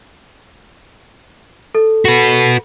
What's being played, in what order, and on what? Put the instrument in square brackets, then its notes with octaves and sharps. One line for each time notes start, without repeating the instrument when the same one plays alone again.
[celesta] A4
[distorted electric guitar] F#4 B4